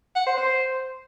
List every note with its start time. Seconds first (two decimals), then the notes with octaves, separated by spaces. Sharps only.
0.16 F#5
0.26 C5
0.37 C5